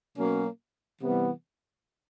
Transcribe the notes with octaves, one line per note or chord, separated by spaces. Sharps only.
B2 F#3 A#3 C#4
C3 E3 G3 B3